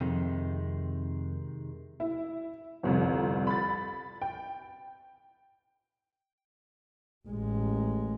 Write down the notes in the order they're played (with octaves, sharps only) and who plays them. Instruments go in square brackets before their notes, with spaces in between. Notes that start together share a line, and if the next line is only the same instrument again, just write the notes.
[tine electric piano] F2 [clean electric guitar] C3 D#3 G#3
[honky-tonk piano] E4
G1 C2 F2
B5 A6
G5
[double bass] A1 G#3